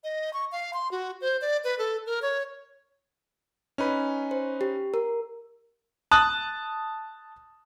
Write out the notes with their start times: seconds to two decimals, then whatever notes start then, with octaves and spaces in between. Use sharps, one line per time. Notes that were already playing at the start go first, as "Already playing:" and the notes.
0.04 D#5
0.33 C#6
0.52 F5
0.74 C6
0.91 F#4
1.21 C5
1.41 D5
1.64 B4
1.78 A4
2.07 A#4
2.22 C#5
3.78 C#4 D#4 B4
4.31 C5
4.61 G4
4.94 A#4
6.11 A5 D#6 F#6